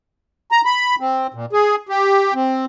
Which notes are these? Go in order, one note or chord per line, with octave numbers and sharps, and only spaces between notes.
A#5
B5
C4
A#2
G#4
G4
C4